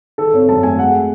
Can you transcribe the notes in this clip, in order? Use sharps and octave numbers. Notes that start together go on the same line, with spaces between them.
D#3 A4
G#1 C#5
F#2 A5
A3 G#5
G#3 F#5